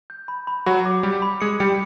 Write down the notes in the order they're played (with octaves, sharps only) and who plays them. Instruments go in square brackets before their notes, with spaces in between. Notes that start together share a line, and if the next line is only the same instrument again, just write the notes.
[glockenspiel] G6
B5
B5
[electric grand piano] F#3 F#4 [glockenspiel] B5
[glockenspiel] D6
[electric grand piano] G3 G4 [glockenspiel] B5
[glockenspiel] B5
[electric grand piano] G#3 G#4 [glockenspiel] C#7
[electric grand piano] G3 G4 [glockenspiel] C#7